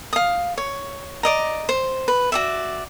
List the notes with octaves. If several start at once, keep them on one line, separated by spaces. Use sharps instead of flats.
F5 D#6
C#5
D5 D#5 A#5
C5
B4
F#4 D5 E5